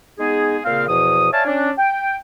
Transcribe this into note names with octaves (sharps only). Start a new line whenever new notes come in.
G#3 B3 D#4 G#4
A#2 C#3 A#3 C4 F5
E2 B2 F3 D#6
C#5 D5 E5 F5 G#5 A5
C#4 D4
G5